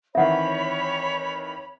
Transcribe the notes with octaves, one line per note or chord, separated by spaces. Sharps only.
D#3 E3 C4 C#5 E5 F#5 B5